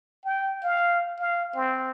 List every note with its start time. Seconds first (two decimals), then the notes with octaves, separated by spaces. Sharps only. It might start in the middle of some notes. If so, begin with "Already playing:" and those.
0.25 G5
0.63 F5
1.20 F5
1.55 C4